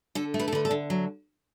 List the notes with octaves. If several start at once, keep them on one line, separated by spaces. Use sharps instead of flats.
D3 A4
A3
B4
A4
D3 B4
A4
D3
F#3